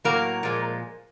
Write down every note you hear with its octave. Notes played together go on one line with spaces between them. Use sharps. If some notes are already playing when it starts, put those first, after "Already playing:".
A2 F#3 A#3 A#4
A#2 F3 G#3